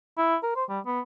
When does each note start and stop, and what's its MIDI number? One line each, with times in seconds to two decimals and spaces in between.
0.18 0.36 64
0.43 0.54 70
0.56 0.64 72
0.69 0.80 55
0.86 1.00 59